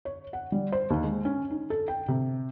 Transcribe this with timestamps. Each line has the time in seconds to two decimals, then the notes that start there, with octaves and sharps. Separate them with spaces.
0.05 C#5
0.33 F#5
0.52 G3
0.72 C5
0.90 D#2
1.04 G#3
1.25 C#4
1.50 D#4
1.70 A4
1.88 G5
2.08 C3